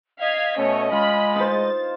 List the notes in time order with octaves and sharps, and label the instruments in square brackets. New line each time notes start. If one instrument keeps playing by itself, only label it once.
[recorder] D#5 [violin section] F5 G#6 B6
[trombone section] B2 A3 [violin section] C#4 C#5
[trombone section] G#3 [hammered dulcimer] F4 [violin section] B5
[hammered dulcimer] D#4 C5 [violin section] A6